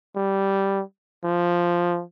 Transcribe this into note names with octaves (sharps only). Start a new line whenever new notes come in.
G3
F3